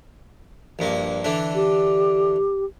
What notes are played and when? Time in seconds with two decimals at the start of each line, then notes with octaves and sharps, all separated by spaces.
0.79 A#1 G2 A#3
1.24 D3 E3 D4
1.55 G4